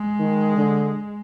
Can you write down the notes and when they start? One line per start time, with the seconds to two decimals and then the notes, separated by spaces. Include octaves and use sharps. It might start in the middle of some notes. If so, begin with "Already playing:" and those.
Already playing: G#3
0.19 D#3
0.57 D3